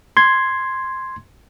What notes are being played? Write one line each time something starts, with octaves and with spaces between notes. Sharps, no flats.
C6 G#6